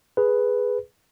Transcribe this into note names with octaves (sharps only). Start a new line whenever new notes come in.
G#4 B4